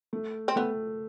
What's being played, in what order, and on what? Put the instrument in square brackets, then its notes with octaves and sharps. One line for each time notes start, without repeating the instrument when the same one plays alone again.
[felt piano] A3
[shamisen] C4
[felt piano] A3 [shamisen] B3